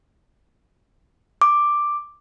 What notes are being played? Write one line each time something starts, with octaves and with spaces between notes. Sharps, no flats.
D6